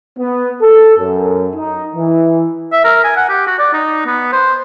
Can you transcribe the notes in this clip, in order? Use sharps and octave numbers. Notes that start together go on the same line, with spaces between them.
B3
A4
F#2
D#4
E3
E5
A#4
G#5
F#5
G4
F#4
D5
D#4
B3
C5